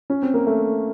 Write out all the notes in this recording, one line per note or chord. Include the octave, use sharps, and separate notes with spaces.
C#4
C4
A#3
A3